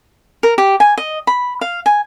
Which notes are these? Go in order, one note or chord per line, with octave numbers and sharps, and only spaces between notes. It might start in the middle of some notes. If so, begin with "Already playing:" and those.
A#4
G4
G#5
D#5
B5
F5
G#5